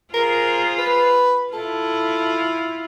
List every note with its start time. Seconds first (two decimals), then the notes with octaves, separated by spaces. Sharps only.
0.14 F4 G#4 A#4 C5
0.79 B4
1.53 E4 F4 A4